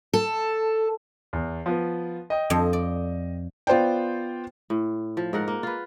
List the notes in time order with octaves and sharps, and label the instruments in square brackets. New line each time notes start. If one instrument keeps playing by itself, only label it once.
[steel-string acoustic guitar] A4
[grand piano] E2
F3 B3
D#5 G5
[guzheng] F2
D5
[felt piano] B3 F4 C5 D5 G5
[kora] A2
F3
G#2 A#4 F#5
A#3
F4 B4